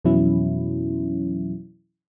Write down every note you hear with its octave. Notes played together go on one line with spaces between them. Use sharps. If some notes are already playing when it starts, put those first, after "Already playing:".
F2 B2 E3 F#3 C#4 E4